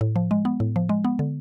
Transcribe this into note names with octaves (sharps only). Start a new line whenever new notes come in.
A2
F3
G#3
B3
A2
F3
G#3
B3
D3